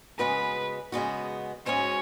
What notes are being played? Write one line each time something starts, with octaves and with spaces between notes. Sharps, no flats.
C#3 G#3 B3 F#4 B4
C#3 G#3 B3 F#4
G#2 G#3 C#4 F#4 C#5